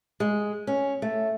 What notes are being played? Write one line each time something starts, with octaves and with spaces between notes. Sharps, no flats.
G#3
C#4
A3